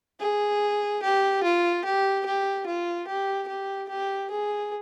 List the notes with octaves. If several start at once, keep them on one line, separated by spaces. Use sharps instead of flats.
G#4
G4
F4
G4
G4
F4
G4
G4
G4
G#4